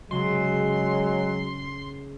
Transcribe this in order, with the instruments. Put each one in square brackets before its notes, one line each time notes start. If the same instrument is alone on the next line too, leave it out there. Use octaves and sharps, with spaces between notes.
[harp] C#3 [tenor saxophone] F#3 [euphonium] G#3 [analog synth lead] C6